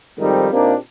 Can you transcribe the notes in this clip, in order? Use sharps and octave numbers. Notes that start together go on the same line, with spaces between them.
F2 G#2 D#3 G3 C4 D#4
A#2 A#3 C4 D4 D#4 G4